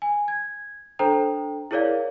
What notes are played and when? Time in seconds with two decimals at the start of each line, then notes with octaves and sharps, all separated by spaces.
0.02 G#5
0.28 G#6
0.99 D4 A4 C5 G5 A#5
1.71 E4 G#4 A#4 C#5 D5 F5